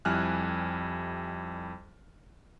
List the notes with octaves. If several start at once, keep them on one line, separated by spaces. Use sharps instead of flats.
F2 G3 E4 G#5 F6 F#6